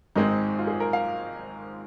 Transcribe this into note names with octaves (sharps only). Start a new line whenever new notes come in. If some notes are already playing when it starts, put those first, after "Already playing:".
G#1 G#2 G#3 C4 D#4
F4
G#4
A#4
F5